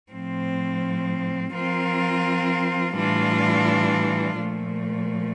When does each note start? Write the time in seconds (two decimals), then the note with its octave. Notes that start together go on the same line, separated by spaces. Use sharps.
0.11 A2 F3 C4
1.52 F3 C4 F4 A#4
2.94 A2 E3 G3 D4 F4
4.36 A#2 F3 A3